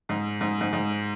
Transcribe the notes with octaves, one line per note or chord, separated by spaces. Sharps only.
G#2
G#2
G#2
G#2